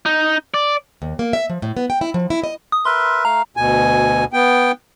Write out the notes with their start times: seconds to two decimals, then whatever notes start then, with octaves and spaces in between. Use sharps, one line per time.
0.06 D#4
0.54 D5
1.02 D#2
1.19 A#3
1.33 E5
1.50 F3
1.62 A2
1.77 B3
1.90 G5
2.01 E4
2.14 F3
2.30 E4
2.44 D#5
2.72 D#6
2.85 A#4 B4 E5 C6
3.25 A3 F5 A#5
3.57 D2 B2 G#5
4.33 B3 G5